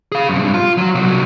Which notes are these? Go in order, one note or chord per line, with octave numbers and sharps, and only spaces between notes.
G#4 F5
F#2 C3
G2
F4
F#3 F#4
C2 F#3